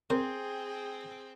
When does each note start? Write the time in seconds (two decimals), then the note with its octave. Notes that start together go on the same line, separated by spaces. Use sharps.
0.10 C4 G#4 A#4 C5 G5